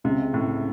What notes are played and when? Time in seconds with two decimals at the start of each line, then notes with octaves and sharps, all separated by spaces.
0.04 C#2 C3
0.34 C#2 A2